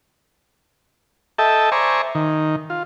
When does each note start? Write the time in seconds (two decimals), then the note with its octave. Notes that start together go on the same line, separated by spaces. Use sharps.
1.38 A4 D#5 E5 G5 A5
1.72 C5 D5 E5 G#5 A#5 C#6
2.15 D#3
2.70 F4